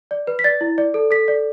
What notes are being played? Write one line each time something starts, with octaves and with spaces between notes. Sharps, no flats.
D5
B4
B6
D5 A6
E4
D5
A4
A4 B6
D5